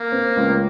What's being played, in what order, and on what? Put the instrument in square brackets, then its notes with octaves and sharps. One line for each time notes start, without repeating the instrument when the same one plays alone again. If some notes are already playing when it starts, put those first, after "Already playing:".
Already playing: [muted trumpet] A#3
[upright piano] C4
C#2